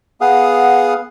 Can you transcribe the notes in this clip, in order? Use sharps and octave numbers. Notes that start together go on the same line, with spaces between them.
B3 G#4 F5 F#5 D#6